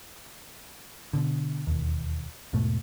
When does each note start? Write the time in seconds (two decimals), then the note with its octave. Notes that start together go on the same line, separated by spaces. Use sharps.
1.13 B2 D3
1.67 E1 D#2
2.53 E1 G#2 B2 A3